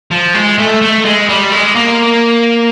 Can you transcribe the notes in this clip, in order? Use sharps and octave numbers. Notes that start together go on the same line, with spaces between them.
F3
G#3
A3
A3
G#3
G3
G#3
A#3